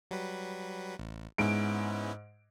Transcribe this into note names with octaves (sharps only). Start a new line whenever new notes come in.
F#3 G3 B4
A1
G#2 B3 C#4 E4 D7